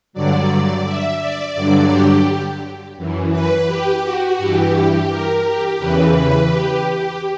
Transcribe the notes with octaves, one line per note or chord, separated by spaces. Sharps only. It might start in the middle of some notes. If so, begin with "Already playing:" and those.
G2 D3 F#3 D5
E5
D5
G2 D3 F#3
G4
F#2 E3
B4
G4
F#4
G2 E3 G4
A#4
G4
E2 C#3 E3 B4
B4
G4
G4